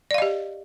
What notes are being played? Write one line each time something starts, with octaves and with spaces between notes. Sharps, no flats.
G4 D5 D#5 F5